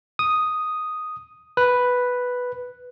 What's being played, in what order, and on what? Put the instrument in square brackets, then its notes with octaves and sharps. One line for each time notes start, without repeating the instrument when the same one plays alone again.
[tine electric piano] D#6
B4